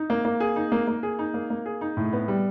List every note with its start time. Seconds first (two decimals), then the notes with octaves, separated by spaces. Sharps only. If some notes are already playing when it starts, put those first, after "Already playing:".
Already playing: D#4
0.10 A#3
0.25 A#3
0.40 G#4
0.56 D#4
0.72 A#3
0.87 A#3
1.03 G#4
1.19 D#4
1.34 A#3
1.50 A#3
1.66 G#4
1.81 D#4
1.97 A2
2.13 B3
2.28 G3